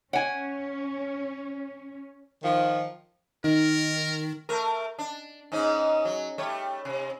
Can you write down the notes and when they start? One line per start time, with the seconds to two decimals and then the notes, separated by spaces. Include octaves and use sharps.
0.13 C#4 C#5 F#5 G#5
2.43 D#3 F3
3.44 D#3 D#4 A#4
4.49 A3 A#4
4.99 D4
5.52 G#2 C#4 D#4
6.05 F#3
6.38 G3 A3 C#5
6.85 C3